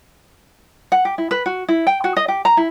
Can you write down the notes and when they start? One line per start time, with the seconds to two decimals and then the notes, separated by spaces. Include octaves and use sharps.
0.92 F#5
1.05 G4
1.18 E4
1.31 B4
1.46 F#4
1.68 E4
1.87 G5
2.04 F#4
2.16 D#5
2.28 G4
2.45 A#5
2.57 E4